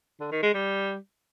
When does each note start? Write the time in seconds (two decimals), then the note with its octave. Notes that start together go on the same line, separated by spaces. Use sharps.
0.20 D3
0.31 D#3
0.43 G#3
0.54 G3